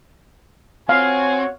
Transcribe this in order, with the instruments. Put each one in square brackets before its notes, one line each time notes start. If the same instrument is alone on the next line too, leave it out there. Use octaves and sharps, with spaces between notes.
[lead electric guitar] C4 [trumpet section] F#4 C#5 [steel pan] F5 [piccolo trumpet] G#5